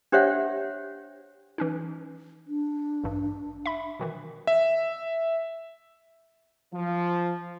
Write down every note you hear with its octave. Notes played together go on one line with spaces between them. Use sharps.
D4 G4 C5 C#5 E5 F#5
E3 C#4 D#4
D4
A1 G2
E5 B5
B2 D#3 E3
E5
F3